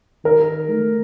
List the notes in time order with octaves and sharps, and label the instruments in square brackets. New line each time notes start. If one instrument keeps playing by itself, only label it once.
[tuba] D#3 [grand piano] A#4
[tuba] A3